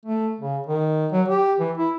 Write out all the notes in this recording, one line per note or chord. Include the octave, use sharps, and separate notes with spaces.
A3
C#3
D#3
F#3
G4
E3
E4